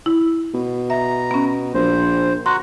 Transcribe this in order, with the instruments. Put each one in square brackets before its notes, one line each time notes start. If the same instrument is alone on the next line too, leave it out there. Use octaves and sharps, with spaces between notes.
[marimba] E4
[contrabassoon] B2
[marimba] E5 [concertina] A#5
[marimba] B3 C#4
[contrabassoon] A#1 [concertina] C5
[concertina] F#4 F#5 A#5 [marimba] C6